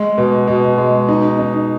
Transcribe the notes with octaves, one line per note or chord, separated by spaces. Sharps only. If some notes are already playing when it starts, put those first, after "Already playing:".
Already playing: G#3
B2
B2
G#3
D#4
D#4